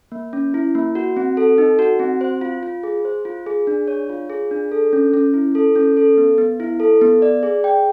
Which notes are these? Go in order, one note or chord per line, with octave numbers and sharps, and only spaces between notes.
A#3
C#4
E4
A#3
F#4
C4
A4
D#4
F#4
C4
C5
F4
F4
G#4
C5
F4
G#4
D4
C#5
F4
G#4
D4
A4
C#4
C#4
E4
A4
C#4
A4
B3
B3
E4
A4
B3
D5
G#4
G5